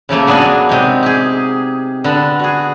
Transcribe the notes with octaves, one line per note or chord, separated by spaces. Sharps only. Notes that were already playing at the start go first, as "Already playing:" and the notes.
C#3 F3 A3 A#3
F#3 B3 D4 G#4 A#4 G#5
C3 G#3 D#4
G4 G#4
D3 B3 A5
F#4 G#4